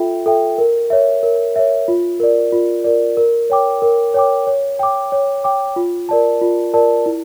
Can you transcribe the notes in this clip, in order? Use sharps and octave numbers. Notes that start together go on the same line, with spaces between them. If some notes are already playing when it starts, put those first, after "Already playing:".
Already playing: F4 A4 E5 G5
A4 E5 G5
A#4
C#5 E5
A#4
C#5 E5
F4
A#4 D5
F4
A#4 D5
A#4
C#5 G5 D6
A#4
C#5 G5 D6
C#5
G5 D6
C#5
G5 D6
F4
A#4 D5 A5
F4
A#4 D5 A5
E4